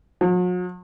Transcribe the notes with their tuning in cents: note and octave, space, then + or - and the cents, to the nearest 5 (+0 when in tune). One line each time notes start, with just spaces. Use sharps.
F#3 -45